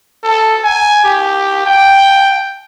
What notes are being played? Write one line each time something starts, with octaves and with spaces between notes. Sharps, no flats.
A4
G#5
G4
G5